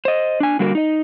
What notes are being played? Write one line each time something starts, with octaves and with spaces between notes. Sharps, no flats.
C5 D#5
D4 G#5
D3 G3 A#3 F#4 G#4 A#4
D#4 D#5